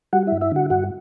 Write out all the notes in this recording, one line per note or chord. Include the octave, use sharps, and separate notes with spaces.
G3 F#4 F#5
G2 E4 E5
E4 E5
D3 F#4 F#5
G2 F#4 F#5